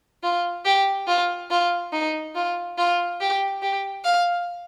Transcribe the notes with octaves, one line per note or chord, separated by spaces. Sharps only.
F4
G4
F4
F4
D#4
F4
F4
G4
G4
F5